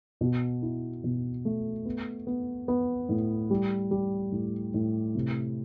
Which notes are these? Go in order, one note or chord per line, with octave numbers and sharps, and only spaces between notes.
B2
E4
B2
A3
B3
B3
B3
A2
G3
G3
A2
A2
C3